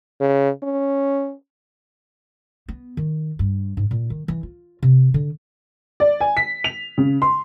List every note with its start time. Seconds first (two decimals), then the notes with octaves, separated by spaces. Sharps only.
0.21 C#3
0.63 C#4
2.68 B3
2.97 D#3
3.39 G2
3.77 G#2
3.91 A#2
4.10 D#3
4.28 E3
4.43 F4
4.83 C3
5.14 D3
6.00 D5
6.21 G#5
6.37 B6
6.64 F7
6.98 C#3
7.22 C6